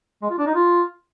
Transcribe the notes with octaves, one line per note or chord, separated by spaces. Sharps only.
G#3
F4
D4
D#4
F4